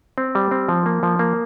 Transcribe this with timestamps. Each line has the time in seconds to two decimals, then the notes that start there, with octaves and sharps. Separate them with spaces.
0.18 C4
0.35 G3
0.51 C4
0.68 F3
0.86 A#3
1.03 F3
1.19 A#3